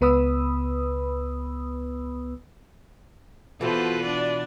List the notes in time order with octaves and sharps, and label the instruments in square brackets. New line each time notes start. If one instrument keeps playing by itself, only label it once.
[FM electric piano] C#2 B3 B4 B5 D#6 E6
[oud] B2 E3 [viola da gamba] F4 F#4 B4 [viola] A4 C5
[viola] D4 D5